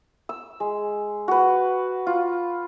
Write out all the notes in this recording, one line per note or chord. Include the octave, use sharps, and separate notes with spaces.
E6
G#3
F#4 B4
F4